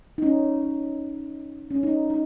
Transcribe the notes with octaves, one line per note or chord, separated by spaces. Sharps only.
D#4
C#4
C#4
D#4
D#4